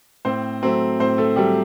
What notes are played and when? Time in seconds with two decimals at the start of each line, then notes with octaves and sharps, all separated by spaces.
0.25 A2 C4 C5
0.63 F#3 A3 C4 C5
0.99 A2 C4 C5
1.18 A3 A4
1.36 F#3 G3 A3 G4